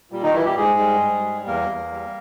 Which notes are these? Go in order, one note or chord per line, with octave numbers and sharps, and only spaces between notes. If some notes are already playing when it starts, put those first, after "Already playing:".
A#2 G3
D#3 D#4
E3 G3 E4
G3 G4
G#2 G#3 G#4
G3
G#2
G3
E2 A#3 A#4
E2
G3